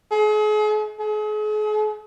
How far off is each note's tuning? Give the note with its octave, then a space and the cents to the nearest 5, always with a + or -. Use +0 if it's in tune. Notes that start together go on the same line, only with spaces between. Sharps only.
G#4 +40
G#4 +40